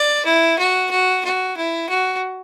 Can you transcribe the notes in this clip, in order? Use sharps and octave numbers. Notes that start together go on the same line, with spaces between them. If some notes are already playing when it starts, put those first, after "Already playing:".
Already playing: D5
E4
F#4
F#4
F#4
E4
F#4